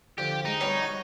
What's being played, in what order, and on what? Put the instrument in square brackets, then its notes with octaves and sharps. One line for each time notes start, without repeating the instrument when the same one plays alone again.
[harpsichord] D3 F3 [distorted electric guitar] G4
[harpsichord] G#3 [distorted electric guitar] D#4
[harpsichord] G3 B3 C#4 [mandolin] C#5
[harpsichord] F#4